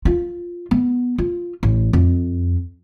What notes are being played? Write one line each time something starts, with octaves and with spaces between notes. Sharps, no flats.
F4
B3
F4
A1
F2